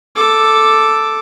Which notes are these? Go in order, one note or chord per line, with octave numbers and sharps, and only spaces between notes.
A4 D6